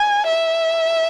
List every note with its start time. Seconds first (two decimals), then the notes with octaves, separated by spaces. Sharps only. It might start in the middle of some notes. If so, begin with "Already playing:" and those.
Already playing: G#5
0.27 E5